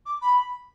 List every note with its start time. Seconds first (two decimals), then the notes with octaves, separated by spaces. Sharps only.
0.06 D6
0.21 B5